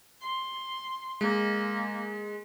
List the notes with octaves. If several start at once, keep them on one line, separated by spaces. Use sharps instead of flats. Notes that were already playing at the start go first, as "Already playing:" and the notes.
C6
G#3 A#3